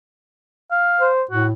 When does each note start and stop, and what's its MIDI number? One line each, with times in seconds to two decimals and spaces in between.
0.71 1.07 77
1.00 1.23 72
1.31 1.53 45
1.31 1.46 66